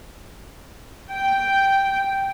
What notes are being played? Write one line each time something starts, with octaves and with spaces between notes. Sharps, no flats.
G5